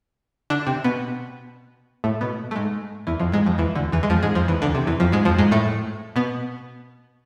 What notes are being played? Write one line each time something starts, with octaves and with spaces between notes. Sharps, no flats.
D3 D4
C3 C4
B2 B3
A2 A3
B2 B3
A3
G#2 G#3
E2 E3
F2 F3
G#2 G#3
F2 F3
E2 E3
D2 D3
E2 E3
G#3
F2 F3
G#2 G#3
F2 F3
E2 E3
D2 D3
C3
E2 E3
F2 F3
G#2 G#3
F2 F3
G#2 G#3
A2 A3
B2 B3